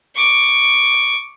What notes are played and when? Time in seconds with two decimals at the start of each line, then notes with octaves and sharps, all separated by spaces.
0.15 C#6 D6